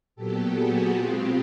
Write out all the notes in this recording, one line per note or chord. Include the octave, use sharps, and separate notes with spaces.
A#2 F#3 B3 G4 A4
F#4 G#4
B2 G#3 C4 F4 G4